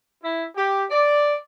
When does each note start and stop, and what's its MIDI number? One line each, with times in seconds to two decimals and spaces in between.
0.24 0.45 64
0.56 0.83 67
0.90 1.34 74